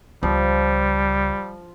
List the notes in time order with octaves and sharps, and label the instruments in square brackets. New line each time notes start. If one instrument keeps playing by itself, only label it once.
[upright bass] C#2 [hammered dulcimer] F3 [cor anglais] G3